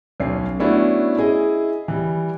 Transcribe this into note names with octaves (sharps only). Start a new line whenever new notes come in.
B1 C#4 C7
A3 B3 C#4 D4 E4 F#4
E4 G#4 D#5
E3 G3